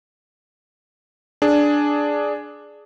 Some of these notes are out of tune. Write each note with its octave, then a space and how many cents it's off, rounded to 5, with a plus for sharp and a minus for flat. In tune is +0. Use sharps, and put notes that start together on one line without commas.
D4 +0 G#4 +10